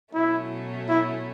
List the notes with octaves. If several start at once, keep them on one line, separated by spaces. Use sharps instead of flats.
B2 F#3 A3 C#4 E4
E4